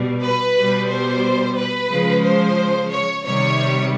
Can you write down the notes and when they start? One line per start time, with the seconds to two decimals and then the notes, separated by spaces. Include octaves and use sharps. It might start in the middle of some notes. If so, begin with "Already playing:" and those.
Already playing: B2 G3
0.24 B4
0.58 B2 G3
0.91 C5
1.58 B4
1.91 C#3 F3 G#3
2.24 C5
2.91 C#5
3.25 C3 D#3 G3 C#5